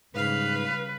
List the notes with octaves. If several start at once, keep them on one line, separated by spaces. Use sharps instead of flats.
G#2 C#3 G3 B4 F5